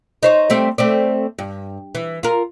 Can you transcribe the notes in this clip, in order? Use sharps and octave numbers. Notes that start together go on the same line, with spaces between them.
D#4 C5 C#5
G3 A3 C4
A3 C4 D5
G2
E3
F4 A#4